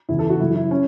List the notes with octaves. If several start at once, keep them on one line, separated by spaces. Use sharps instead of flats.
E2 C#3 E3 E4
A4
F#4
F#2 C#3 F#3 E4
E4
C#4